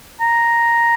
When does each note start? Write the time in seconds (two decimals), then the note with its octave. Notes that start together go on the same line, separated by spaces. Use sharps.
0.20 A#5